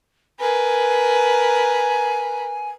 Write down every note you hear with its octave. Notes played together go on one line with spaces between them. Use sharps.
A#4 B4 G#5